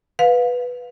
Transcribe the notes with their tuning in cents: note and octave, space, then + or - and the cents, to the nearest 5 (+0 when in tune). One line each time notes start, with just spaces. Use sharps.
B4 +0 F5 +25